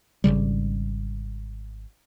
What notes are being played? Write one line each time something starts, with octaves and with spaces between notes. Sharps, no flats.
G#1 C#2 C#3 G3